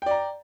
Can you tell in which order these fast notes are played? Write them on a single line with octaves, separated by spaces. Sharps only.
G5 D5 A#5